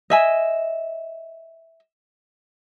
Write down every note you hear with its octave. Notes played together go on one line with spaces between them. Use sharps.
D#5 E5 G#5